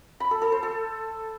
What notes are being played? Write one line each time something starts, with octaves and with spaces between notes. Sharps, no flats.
B5
A4
A4
C5
A4